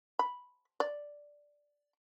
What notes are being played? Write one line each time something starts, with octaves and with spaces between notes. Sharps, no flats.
B5
D5